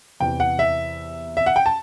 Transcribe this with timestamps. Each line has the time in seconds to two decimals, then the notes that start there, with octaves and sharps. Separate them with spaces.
0.20 E2 C3 E3 G5
0.40 F#5
0.59 E5
1.37 E5
1.46 F#5
1.56 G5
1.66 A5